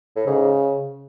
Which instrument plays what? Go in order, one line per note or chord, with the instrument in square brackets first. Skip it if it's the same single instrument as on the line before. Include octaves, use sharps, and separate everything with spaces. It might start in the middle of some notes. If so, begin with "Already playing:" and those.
[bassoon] A2
[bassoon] G#2 [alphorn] C#3